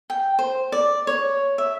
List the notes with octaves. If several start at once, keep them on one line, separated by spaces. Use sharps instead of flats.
G5
C5
D5
C#5
E5